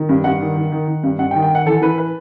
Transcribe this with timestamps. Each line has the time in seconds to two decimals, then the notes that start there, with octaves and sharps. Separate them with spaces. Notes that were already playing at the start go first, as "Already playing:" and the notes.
Already playing: D#3
0.09 G2
0.24 G2 F#5
0.41 D#3
0.56 D#3
0.72 D#3
0.88 D#3
1.03 G2
1.19 G2 F#5
1.31 G5
1.35 D#3
1.42 G5
1.50 D#3 F#5
1.66 E3 A4
1.81 E3 B4
1.98 B4